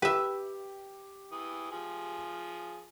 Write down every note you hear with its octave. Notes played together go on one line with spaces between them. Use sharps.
G4 B4 E5
E3 D#6
F3 G#4